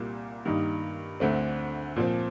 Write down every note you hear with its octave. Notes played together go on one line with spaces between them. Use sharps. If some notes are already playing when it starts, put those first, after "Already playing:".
Already playing: C2 A#2 G3 A#3 F4
G2 D#3 A#3 D#4
D2 D3 A3 C4
A#2 F3 C4